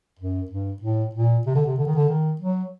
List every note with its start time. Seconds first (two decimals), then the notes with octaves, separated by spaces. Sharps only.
0.20 F#2
0.50 G2
0.82 A2
1.15 A#2
1.46 C3
1.55 D3
1.65 C3
1.78 D3
1.86 D#3
1.95 D3
2.09 D#3
2.41 F#3